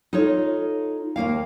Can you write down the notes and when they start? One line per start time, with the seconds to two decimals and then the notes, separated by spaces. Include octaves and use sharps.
0.13 D#4 F4 A4 C#5
1.16 D#2 B2 A#3 F5